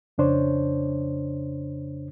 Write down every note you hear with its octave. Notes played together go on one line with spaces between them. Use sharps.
F2 C#3 D4 C5 C#5